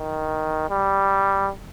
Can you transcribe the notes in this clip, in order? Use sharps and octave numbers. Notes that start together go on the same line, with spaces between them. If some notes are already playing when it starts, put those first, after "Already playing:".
Already playing: D#3
G3